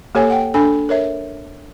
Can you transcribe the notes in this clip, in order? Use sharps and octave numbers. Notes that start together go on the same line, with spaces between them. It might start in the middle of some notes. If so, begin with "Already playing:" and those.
A#3 G4 A4 C#5 F#5 G#5
F#5 G5
D4 A4 G#5 B5
A#4 C#5 E5